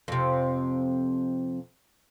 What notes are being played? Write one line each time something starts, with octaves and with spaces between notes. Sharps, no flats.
F2 C3